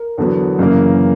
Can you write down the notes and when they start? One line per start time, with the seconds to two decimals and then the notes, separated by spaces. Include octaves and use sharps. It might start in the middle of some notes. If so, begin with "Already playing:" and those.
Already playing: A#4
0.18 E2 D3 F#3 B3
0.59 F#2 C#3 E3 A#3